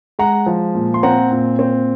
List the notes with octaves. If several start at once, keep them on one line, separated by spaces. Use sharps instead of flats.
G#3 F#5 A#5
F3
A#2
C6
C4 F#5 A#5
A#2
C4